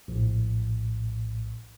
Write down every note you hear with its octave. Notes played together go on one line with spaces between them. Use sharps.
A#1 A2